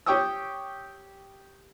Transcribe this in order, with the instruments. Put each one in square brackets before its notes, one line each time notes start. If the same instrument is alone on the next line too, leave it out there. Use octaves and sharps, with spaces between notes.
[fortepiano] G4 C#5 G5 C#6 D#6 E6